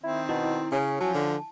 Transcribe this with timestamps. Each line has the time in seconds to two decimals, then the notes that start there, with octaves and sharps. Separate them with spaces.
0.03 D#3 C4 E4
0.29 B2 E4
0.72 C#3 C#4 G#5
1.01 F3 F#3 A5
1.14 D3